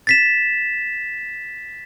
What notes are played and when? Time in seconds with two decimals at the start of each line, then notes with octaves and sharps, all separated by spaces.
0.07 A6 B6 E7